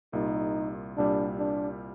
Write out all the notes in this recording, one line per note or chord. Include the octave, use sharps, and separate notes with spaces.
C2 A#2 G3 D#4
C2 A#2 G3 D4
D4